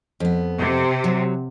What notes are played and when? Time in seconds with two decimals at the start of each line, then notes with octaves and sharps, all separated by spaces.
0.20 F2 B3
0.58 C3
1.04 F#3